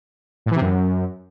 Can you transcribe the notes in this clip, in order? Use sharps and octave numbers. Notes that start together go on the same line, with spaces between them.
A2
E3
C3
F#2